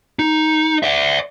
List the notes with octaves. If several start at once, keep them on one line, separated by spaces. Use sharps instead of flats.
D#4
D5 E5